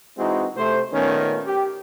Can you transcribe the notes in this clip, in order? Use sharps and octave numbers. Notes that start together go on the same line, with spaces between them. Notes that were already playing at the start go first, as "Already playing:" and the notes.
E3 G#3 C4 D#4 E4 F#4
C3 A3 C5
A#2 D#3 A3 B3 C#4
G4